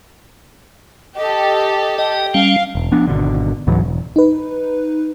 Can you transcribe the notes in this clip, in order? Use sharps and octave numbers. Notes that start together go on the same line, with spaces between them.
G4 A4 D#5
D#5 G5
G3 C#4 F5
E1
F3 B3 D4
G#1 B2 D3
C#2 G#2 E3 F#3
E1
D#4 B4